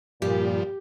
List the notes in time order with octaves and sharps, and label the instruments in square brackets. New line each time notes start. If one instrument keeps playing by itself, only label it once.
[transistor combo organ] G2 F3 [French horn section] A#2 [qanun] G4